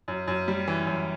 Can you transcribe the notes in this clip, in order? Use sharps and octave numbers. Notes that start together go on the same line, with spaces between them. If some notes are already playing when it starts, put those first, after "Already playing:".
F#2
F#2
G3
E3
F#2